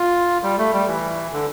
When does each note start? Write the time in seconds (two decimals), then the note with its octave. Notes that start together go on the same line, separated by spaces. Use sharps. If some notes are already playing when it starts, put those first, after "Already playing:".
Already playing: F4
0.43 G3
0.58 A3
0.73 G3
0.88 E3
1.33 D3